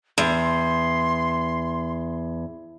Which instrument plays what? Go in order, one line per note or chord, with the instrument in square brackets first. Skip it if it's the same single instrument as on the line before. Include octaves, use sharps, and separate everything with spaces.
[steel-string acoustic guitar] E2 [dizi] C6